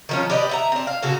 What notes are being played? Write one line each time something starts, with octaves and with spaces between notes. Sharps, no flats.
D#3 F3 C#4
G4 B4 D5 D#5
E5 F#5 A#5
C4 D4
F5
A#2 C#3 F#4 A4